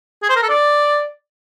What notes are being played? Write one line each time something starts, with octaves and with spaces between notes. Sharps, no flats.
G#4
C5
A#4
A4
D5